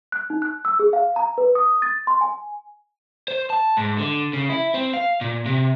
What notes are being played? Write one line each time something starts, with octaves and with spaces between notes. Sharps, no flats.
F#6
D#4
F#6
E6
G#4
F5
A#5
B4
D#6
A6
C6
G#5
C5
A5
G#2
D3
C#3
E4
C4
F5
A#2
C3